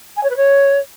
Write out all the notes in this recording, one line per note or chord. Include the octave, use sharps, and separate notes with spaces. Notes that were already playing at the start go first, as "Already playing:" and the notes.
G#5
C#5
B4
C#5